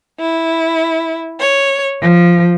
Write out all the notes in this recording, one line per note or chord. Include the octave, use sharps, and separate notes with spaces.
E4
C#5
F3